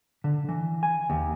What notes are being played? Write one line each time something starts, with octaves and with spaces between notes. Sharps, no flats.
D3
E3
G#5
D#2